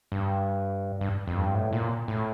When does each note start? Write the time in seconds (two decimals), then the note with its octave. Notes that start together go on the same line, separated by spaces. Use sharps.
0.12 G2
1.01 G2
1.27 F2
1.37 G2
1.55 A2
1.73 A#2
2.08 A2